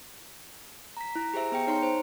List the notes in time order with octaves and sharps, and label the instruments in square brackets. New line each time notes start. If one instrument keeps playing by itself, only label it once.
[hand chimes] A#5 B6
E4 A#5
G4 G#4 C5 E5 A#5
B3 G#4 G5 C#7
D#4 C#5 A#5 C6 C#7
C5